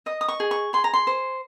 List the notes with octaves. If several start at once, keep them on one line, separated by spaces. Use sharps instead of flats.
D#5 D#6
D#6
C#6
G#4
C#6
G#4 C6
A#5
C6
C5